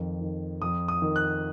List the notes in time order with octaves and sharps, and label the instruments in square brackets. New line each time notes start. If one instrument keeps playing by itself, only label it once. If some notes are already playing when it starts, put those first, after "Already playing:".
Already playing: [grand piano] F2 D#3
D#3
F2 D#6
D#6
D#3
F#6